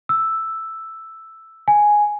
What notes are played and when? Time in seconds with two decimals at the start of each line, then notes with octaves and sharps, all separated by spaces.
0.09 E6
1.68 G#5